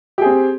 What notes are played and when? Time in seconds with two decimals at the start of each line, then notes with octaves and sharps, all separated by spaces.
0.18 G4
0.22 G#4
0.26 C4